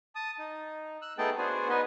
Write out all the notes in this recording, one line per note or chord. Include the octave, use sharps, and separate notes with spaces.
A5 D#6
D#4
E6 F#6
A3 B3 D#4 G#4 G5 A5
B3 D4 F#4 G#4 C5 G#5
B3 D#4 B4 D#5 G#5